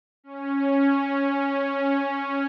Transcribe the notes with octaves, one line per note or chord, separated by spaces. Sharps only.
C#4